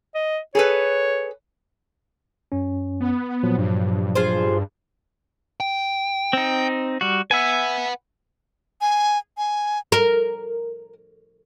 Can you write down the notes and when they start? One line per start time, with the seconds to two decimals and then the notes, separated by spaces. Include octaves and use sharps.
0.15 D#5
0.55 G#4 A4 B4 C#5
2.52 F#2 C#4
3.01 B3
3.43 A#2 F3 F#3
3.58 G2
4.15 F4 G#4 C5
5.60 G5
6.33 C4 D#4
7.01 G3 F#4
7.31 B4 E5 F#5 G#5
8.81 G#5
9.38 G#5
9.92 A#4